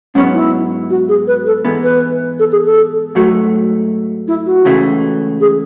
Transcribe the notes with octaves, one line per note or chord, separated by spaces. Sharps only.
G#2 F#3 B3 C#4
E4
F#4
G#4
B4
A4
G#2 E3 B3
B4
A4
G#4
A4
G#2 F#3 A3 F#4
E4
F#4
C#2 C#3 E3 A3
G#4